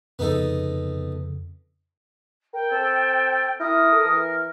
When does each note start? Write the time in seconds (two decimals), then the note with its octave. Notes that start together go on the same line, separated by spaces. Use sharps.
0.19 F2 C#3 B3 D#4 A4
2.53 A#4 G5
2.71 C4 A4
3.60 E4 A#4 D#6
3.92 A4
4.05 E3